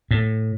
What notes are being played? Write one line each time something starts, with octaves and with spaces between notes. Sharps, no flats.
A2